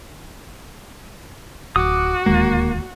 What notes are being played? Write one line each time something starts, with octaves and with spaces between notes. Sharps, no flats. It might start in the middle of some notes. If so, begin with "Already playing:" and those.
D1 F#4 D6 D#6
D1 D#2 G#3 A#3